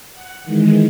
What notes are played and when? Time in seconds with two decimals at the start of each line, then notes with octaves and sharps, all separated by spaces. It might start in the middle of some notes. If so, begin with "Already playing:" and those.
0.13 F#5
0.44 D#3 E3 G#3